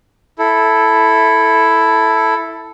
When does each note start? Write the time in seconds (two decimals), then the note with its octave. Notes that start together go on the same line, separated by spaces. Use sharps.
0.39 E4 A4